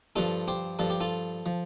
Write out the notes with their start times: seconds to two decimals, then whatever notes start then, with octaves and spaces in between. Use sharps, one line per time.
0.16 G2 F3 F4 A4
0.48 G4 C5
0.79 G2 F3 A4
0.90 G4
1.00 F4 A4
1.46 F3